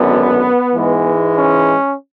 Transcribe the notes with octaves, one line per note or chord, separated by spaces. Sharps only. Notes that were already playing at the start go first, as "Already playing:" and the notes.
Already playing: G#1 F#2 D3 B3
G#2 E3 G#3
C#4